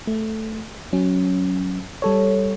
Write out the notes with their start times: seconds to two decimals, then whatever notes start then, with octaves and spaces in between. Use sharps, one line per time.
0.07 A3
0.93 F#3 C#4
2.02 G3 A4 C#5